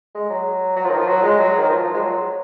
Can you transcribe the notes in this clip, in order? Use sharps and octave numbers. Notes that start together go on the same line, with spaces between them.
G#3
F#3
F#3
F3
D#3
F3
F#3
G#3
F#3
D#3
F3
F3
G#3
F#3